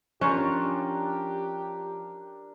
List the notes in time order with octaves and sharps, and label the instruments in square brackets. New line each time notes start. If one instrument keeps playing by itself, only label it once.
[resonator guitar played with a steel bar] F3 C#5 [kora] C#4 [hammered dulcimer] D4 A#4 [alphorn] G4